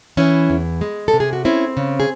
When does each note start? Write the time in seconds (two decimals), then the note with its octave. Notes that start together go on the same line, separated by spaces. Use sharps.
0.17 E3 C#4 E4
0.50 E2
0.81 G#3
1.08 A4
1.13 C3
1.20 G#4
1.33 F#4
1.45 C4 C#4 E4
1.77 C#3
2.00 G#4